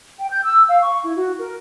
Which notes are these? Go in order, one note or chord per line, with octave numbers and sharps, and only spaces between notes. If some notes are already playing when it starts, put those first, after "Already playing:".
G5
G6
E6
F5
C#6
E4
F#4
A#4